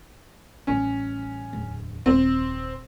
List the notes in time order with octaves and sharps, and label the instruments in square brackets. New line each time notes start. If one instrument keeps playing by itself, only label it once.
[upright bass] A1 G3 [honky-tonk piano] C#4
[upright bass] D1 E2
[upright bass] D#1 C2 [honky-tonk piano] C4